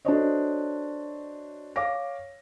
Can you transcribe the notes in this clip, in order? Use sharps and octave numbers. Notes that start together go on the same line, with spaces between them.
D4 F#4 A4 C5 C#5 D#5
C#5 F5 D6 A#6